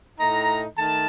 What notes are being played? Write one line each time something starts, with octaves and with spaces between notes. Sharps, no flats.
A2 A3 D#4 A#5
D#3 A3 A5